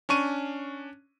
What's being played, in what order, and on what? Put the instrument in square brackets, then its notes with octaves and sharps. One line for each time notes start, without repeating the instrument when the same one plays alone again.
[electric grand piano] C#4 D4 C#6 D#7